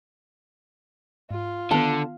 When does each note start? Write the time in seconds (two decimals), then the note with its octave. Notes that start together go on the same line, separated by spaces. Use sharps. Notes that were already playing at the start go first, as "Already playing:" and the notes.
1.31 G#2 F4
1.71 D3 D#3 B3 A5